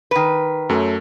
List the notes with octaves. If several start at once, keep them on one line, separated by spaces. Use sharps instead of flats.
D#3 B4
F#2 F#3 A3